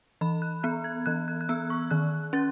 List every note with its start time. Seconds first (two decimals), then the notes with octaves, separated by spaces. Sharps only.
0.21 E3 B5
0.42 F#6
0.63 B3 F#6
0.84 G#6
1.06 E3 F#6
1.28 F#6
1.41 F#6
1.49 B3 E6
1.70 C#6
1.91 D#3 F#6
2.33 C#4 A6